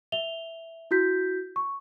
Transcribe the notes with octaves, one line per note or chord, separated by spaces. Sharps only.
E5 F7 G7
E4 F#4 G6 B6
C#6